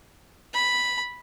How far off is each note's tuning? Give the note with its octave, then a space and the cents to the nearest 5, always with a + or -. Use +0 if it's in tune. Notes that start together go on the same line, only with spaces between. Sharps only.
B5 -5